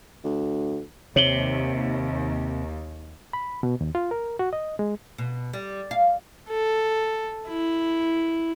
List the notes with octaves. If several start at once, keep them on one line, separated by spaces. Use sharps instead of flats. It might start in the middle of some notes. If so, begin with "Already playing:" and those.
D2
D#2 C3 C#5 F#7 G7
B5
B2
D#2
F4
A#4
F#4
D#5
G#3
B2
G3
F5
A4
E4